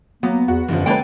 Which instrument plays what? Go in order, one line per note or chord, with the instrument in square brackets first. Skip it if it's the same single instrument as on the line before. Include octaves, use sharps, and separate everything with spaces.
[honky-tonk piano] F#3 [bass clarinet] A#3 [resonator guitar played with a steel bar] B3
[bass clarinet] E2 [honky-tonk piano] F#4
[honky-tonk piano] F1 D3 F3 [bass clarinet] F#2
[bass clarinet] G#3 [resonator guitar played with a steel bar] A#3 A4 G5 [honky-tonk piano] C#4 B4